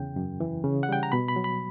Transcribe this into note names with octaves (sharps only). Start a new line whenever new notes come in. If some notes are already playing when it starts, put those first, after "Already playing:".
Already playing: E2 C#3 G5
F#2
E3
C#3
F#5
G3 G5
A#5
B2 B5
B5
F#3
B5